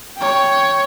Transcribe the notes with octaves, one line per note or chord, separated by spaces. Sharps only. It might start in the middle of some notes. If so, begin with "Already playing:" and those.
C#5 G5